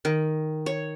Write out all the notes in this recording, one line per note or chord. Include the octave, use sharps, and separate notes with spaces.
D#3
C#5